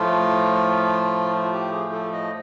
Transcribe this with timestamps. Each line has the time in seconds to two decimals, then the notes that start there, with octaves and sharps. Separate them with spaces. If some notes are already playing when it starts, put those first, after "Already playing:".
Already playing: A2 F3 A3 F4
1.53 G4
1.72 G#4
1.92 A4
2.13 D#5